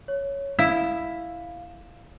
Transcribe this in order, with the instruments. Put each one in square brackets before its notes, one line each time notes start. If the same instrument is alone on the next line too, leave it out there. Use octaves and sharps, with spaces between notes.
[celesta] C#5
[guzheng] E4 [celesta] F5 E7